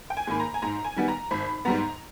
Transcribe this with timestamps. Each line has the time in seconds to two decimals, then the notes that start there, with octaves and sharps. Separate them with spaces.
0.10 G5
0.17 G#5
0.27 G#2 D#3 A#3 B5
0.40 A#5
0.54 G#5
0.62 G#2 A#5
0.85 G#5
0.96 D#3 G3 B3
1.08 A#5
1.31 G#1 B5
1.65 G#2 G3 B3 A#5